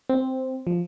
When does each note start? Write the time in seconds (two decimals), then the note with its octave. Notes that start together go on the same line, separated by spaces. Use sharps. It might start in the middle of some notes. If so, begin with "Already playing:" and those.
0.09 C4
0.67 F3